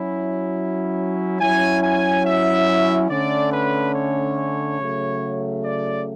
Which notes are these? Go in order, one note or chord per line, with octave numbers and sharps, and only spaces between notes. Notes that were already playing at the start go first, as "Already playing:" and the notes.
Already playing: F#3 C#4 E4
F#3 C#4 E4 G#5
G#5
E5
D3 A3 C#4 D5
B4
C#5
C#3 F#3 A3
D5